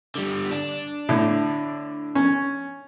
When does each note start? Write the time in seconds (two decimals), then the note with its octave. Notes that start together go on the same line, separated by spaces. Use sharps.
0.15 D3 G3
0.51 D4
1.09 A2 D3
2.15 C#4